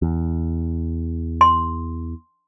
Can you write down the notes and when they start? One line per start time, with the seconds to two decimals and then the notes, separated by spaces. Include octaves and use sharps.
0.02 E2
1.41 C6